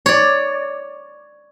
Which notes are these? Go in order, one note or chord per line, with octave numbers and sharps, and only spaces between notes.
C#5 D5